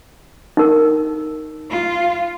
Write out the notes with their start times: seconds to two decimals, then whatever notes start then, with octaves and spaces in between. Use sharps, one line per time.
0.57 D#4 A#4
1.70 F4